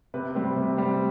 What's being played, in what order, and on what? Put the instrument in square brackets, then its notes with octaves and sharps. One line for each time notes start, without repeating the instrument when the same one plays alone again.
[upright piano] C3 B4
G3 C4
C3
G3 C4